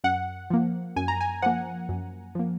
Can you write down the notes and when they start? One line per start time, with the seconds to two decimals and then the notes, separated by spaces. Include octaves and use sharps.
0.04 F#2 F#5
0.50 F3 A#3
0.96 F#2 G#5
1.08 A#5
1.21 G#5
1.42 F3 A#3 F#5
1.89 F#2
2.35 F3 A#3